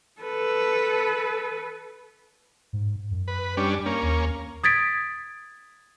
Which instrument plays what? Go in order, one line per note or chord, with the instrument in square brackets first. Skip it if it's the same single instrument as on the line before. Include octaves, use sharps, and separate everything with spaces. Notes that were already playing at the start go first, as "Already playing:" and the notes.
[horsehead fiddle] A4 B4
[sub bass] G#2
F#2
[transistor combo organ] B4
G3 C#4 D4
A#3 C#4
[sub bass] D#2
[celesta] D#6 G#6 A6 B6 D7